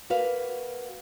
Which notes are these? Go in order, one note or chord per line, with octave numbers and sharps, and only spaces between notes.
A#3 F#4 B4 F5